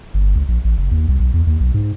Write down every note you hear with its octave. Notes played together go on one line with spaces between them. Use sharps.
G1
C#2
A#1
A1
F#1
D#2
C2
B1
E2
D#2
B1
G#2